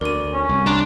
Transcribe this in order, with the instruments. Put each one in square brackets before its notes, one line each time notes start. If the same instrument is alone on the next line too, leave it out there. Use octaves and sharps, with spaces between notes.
[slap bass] D2 [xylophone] A#4 D#7 [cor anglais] D5
[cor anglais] C#4
[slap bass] C2
[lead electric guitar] D4 [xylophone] A#5 C6 F#6